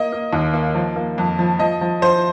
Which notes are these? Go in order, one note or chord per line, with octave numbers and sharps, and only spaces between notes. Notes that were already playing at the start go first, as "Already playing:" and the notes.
Already playing: A#3 D#5
A#3
D#2
A#3
F3
A#3
F2
F3
F3 D#5
F3
F3 C5